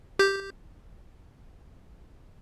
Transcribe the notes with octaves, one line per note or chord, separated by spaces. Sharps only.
G4 G6